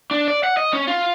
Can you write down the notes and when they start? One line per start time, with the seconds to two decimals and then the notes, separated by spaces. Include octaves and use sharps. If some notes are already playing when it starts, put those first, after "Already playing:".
0.11 D4
0.28 D5
0.43 F#5
0.57 D#5
0.73 C#4
0.87 F4